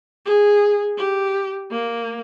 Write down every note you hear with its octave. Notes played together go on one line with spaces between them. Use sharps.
G#4
G4
A#3